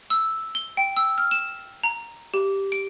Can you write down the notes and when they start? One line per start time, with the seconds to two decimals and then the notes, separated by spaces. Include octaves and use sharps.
0.10 E6
0.55 G7
0.77 G5
0.97 E6
1.18 F6
1.31 E7
1.83 A#5
2.34 G4
2.72 D7